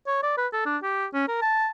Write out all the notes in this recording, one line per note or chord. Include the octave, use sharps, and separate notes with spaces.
C#5
D5
B4
A4
D4
G4
C#4
A#4
A5